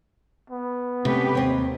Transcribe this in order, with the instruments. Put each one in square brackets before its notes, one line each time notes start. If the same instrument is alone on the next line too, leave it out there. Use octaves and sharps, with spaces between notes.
[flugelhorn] B3
[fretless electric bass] C3 [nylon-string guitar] A3 [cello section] C#4 G4 B4
[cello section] D#2 [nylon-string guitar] C4 C#5